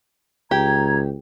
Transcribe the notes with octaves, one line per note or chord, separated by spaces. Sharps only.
C#2 G4 A#5 G#6